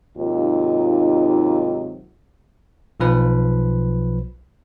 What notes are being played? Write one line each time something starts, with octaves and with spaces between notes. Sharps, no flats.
D#2 G#2 C3 F#3 D#4 F4
B1 F3 B4